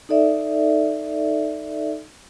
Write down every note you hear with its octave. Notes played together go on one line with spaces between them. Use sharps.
D#4 A4 D5 E5